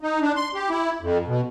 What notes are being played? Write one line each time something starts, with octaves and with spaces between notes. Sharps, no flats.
D#4
D4
C6
G4
E4
F2
B2